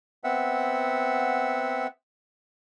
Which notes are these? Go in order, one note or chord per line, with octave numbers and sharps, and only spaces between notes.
B3 C4 E5 F#5